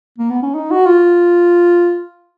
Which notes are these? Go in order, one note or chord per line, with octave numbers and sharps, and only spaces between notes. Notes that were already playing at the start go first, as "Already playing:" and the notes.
A#3
B3
C#4
D#4
F#4
F4